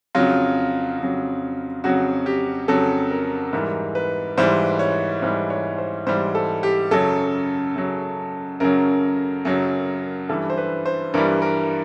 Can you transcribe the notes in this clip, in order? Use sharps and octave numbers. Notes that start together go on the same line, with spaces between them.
F2 C#3 F#3 F4
F2 C#3 F#3
F2 C#3 F#3 F#4
G4
F2 C#3 F#3 A4
A#4
G#2 E3 G3 A#4
B4
G#2 E3 G3 C5
C#5
G#2 E3 G3 C5
C#5
C5
G#2 E3 G3 C5
A4
G4
F#2 C#3 F#3 A4
F#2 C#3 F#3
F#2 C#3 F#3 A#4
F#2 C#3 F#3
G2 E3 G3 A4
C5
B4
C5
G2 E3 G3 A#4
A#4